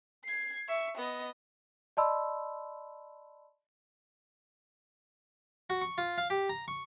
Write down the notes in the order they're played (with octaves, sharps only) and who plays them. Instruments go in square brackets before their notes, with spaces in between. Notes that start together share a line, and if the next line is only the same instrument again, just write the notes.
[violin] G#6 C7
E5 C#6
B3 D#5
[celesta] D5 D#5 A5 B5 C6 E6
[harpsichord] F#4
C#6
F4
F5
G4
A#5
C#6